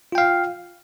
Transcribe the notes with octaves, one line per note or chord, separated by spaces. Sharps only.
F4 F5 G5